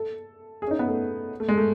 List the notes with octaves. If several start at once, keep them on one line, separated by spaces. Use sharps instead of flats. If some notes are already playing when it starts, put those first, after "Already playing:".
Already playing: A4
G#4
C#4
D#4
B3
A3
A3
G#3
A3